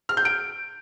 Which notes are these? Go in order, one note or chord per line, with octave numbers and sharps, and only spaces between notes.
F6
G6
D7